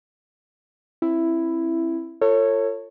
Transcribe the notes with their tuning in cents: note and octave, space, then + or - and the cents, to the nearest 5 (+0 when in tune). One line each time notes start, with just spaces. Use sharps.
C4 +25 E4 +5
F4 +0 A4 +35 C#5 -10